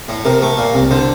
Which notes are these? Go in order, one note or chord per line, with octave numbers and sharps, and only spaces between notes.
A2
C3 A#4
A3 A#4
A#2
C2
A#4
D3 C5